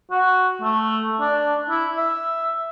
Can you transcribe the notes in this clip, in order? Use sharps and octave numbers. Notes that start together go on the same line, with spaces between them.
F#4
A3
D4
E4
E5